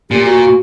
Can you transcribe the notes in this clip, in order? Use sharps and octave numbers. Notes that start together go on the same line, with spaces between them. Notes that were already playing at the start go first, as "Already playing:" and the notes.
A#2 G4
F#4
F#4